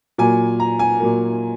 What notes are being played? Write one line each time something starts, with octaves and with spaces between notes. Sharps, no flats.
A#2 F#3 A#3 G#5
A#5
G#5
A#2 F#3 A#3